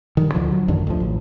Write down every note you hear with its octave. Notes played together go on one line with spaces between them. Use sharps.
G2 D#3
D2 D3 F3
F#3
A1 F#2 D3 D#3
D2 F3
A1